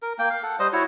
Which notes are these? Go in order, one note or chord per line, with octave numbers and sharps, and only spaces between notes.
A#4
A#3 G5
F5
A4 F#5
G3 C5 D#5
E4 F#4 C#5